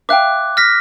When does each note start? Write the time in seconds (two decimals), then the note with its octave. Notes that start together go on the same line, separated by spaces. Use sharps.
0.09 E5 F5 G5 D6 F#6
0.57 F6 A#6 B6